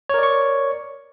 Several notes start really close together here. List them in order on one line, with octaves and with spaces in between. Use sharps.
C#5 A#4 D5 C#6